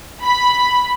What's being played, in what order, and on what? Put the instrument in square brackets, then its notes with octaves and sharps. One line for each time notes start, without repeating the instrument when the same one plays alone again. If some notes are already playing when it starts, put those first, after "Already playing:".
[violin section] B5